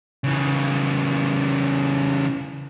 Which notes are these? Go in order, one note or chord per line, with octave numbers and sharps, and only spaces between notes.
C#3 E3